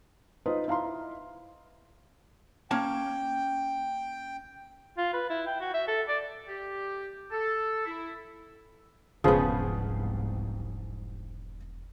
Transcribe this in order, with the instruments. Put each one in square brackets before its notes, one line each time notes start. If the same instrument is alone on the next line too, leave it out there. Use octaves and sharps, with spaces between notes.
[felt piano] D#4 F4 B4 C5 D#5
E4 F5 A#5 C6
[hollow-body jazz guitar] A#3 C#4 A5 [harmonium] G5
[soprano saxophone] F4
B4
E4
G5
F#4
E5
A4
D5
[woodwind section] G4
A4
E4
[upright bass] E1 [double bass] C2 G#2 [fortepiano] C#3 G#4 C5 [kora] F3 B3